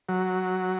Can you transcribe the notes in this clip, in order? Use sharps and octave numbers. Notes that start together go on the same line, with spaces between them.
F#3